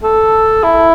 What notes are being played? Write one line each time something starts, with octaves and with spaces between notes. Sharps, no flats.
A4
E4